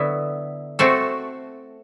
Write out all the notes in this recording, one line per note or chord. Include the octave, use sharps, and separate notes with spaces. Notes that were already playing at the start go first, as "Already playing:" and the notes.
Already playing: D3 F#3 B3 E4
A3 C4 F#4 A4